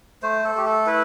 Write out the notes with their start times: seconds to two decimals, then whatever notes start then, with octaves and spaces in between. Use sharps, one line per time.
0.23 A3 C5
0.44 A4
0.55 A3 G4
0.66 A4
0.87 E4 B4